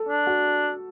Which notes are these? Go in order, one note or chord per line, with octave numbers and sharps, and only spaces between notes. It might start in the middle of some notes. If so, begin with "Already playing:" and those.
Already playing: A4
D4
F#4